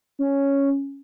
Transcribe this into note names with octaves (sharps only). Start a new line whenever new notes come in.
C#4